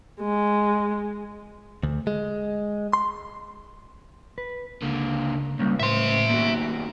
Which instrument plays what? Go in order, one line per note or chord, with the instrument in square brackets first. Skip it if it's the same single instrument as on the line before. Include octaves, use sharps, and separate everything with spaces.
[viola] G#3
[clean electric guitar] D2
G#3
C6
B4
[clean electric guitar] C#2 [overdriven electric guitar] D3 A#3
[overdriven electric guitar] C#2 [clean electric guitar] G3 A#3 C#4
[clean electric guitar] A2 C5 [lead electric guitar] E5 C6
[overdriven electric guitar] B2 D#3 [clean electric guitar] A#3 F#4